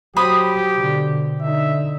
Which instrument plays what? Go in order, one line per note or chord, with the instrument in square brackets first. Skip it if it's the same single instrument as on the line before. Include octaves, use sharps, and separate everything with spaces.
[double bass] F#3 [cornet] G4 [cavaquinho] C5 B5 D#6
[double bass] B2 D3
[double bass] D3 D#4 [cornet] E5